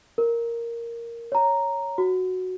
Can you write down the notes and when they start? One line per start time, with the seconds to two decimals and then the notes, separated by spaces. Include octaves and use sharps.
0.18 A#4
1.32 C#5 A#5
1.98 F#4